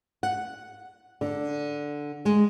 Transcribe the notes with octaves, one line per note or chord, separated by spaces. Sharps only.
F#5
D3
G#3